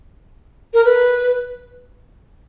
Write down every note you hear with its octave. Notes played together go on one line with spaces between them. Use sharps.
A#4
B4